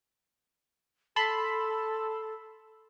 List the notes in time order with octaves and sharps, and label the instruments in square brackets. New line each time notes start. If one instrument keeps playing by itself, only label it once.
[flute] A4 [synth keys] A5 B5 C6